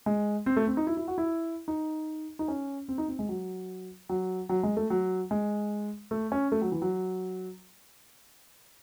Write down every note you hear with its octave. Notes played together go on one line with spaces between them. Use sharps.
G#3
C4
A3
C4
D#4
E4
E4
F#4
E4
D#4
D#4
C#4
C4
D#4
C4
G#3
F#3
F#3
F#3
G#3
A3
F#3
G#3
A3
C#4
A3
F#3
E3
F#3